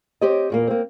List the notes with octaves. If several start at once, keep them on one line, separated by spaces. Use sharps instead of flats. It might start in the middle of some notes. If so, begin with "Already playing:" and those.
C4 G4 C#5 D#5
E2 A#2 A#3
A#3 C4